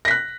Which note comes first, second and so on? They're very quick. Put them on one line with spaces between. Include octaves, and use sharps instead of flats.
A#6 B6 F#6